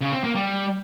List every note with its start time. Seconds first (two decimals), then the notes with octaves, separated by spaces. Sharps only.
0.01 C#3
0.13 C4
0.24 A#3
0.35 G3